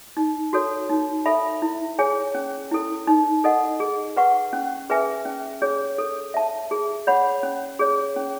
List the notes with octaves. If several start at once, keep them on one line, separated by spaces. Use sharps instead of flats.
D#4
F#4 A4 C#5
D#4
A4 E5 B5
E4
G#4 C#5 G#5
C#4
E4 A4
D#4
A4 D#5 F#5
G#4
B4 F#5 C#6
C#4
G#4 B4 E5 G#5
C#4
G#4 C#5
A4
E5 A5
G#4
C#5 F#5 B5
C#4
G#4 C#5
C#4